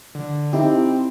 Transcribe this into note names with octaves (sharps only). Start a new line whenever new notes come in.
D3
C4 D#4 E4 G4